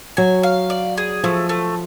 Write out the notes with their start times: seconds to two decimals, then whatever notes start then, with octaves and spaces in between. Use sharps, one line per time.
0.17 F#3 G#5
0.43 F5
0.70 D5
0.98 G#4
1.24 F3 A3
1.49 A3